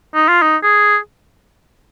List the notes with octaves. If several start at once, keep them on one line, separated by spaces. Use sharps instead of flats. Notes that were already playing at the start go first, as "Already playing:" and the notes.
D#4
F4
D#4
G#4